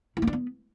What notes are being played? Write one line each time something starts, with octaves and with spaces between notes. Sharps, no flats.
E4
A#3
D4
B3